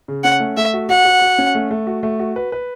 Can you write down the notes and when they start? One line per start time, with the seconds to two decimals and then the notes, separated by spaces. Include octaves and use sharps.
0.08 C#3
0.24 C#4 F#5
0.40 A3
0.57 A3 E5
0.74 F#4
0.89 F#4 F#5
1.05 F#4
1.22 F#4
1.38 C#4
1.55 A3
1.71 A3
1.87 F#4
2.03 A3
2.19 F#4
2.36 B4
2.52 B4